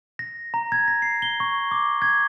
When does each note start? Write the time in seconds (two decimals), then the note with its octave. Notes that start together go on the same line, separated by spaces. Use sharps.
0.19 A#6
0.54 A#5
0.72 G#6
0.88 A#6
1.02 C7
1.22 G7
1.40 C#6
1.71 D6
2.02 G#6